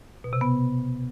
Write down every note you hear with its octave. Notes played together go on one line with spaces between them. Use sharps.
B2
C3
B3